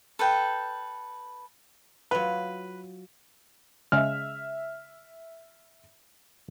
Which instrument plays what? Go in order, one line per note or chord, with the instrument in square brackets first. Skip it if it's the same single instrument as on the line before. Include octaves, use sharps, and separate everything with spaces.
[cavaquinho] A4 B4 G5
[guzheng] F#3 F4 [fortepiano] B4
[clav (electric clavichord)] C#3 G#3 [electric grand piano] E5 F6